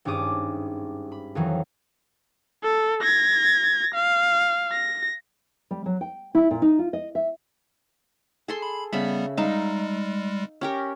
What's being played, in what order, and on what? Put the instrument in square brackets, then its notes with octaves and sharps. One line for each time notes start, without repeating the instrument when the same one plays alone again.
[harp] G#1 G2 C#4 D6 D#6
B5
F2 D#3 E3 F#3
[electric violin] A4
G#6 A#6
F5
A#6
[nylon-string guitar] G3
F#3
G5
E4
A#2
D#4
F4
D#5
E5
[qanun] G#4 A4 C6
[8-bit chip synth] B5
[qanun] C#3 E5 B5 [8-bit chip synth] G3 B3
[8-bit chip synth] G3 G#3 [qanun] D#4 E5 F5
[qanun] C#4 G4 A#4